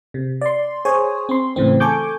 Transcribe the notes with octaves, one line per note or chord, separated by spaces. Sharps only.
C3
D5 C6
G#4 C5 C#5 G#5
C4 C6
A2 C#3 E3 C4
A4 G#5 C#6 D6 G6